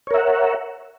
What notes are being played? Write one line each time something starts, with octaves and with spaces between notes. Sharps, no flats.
A#4 C#5 E5 F#5